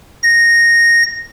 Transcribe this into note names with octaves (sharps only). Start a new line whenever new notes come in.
A#6